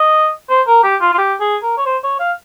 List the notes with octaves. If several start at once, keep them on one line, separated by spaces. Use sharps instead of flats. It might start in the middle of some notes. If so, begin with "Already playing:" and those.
Already playing: D#5
C5
A#4
G4
F4
F4
G4
G#4
A#4
C#5
C5
C#5
F5